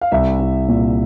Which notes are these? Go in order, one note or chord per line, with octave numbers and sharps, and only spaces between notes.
F5
C2 E5
C2
A#2